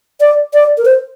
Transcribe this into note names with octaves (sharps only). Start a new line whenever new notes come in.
D5
D5
A#4
C5